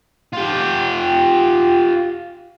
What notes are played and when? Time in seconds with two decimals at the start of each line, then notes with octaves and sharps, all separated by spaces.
0.33 F4 G4